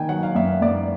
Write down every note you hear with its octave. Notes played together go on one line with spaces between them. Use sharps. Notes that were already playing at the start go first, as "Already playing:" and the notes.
Already playing: D#3 G5 G#5
F#3 F#5
F5
F#2 E5
F#2 D5